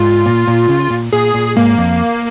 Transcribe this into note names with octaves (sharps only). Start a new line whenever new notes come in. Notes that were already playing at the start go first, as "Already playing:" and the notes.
Already playing: G#2 F4
A#2
A#2
C#3
A#2
A#2 G#4
A#2
G#2 A#3
F2